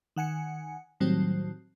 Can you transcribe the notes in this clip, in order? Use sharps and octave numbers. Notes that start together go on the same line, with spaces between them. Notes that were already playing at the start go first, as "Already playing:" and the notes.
D#3 F#5 G#5 C#7
A2 D#3 F#3 G3 C4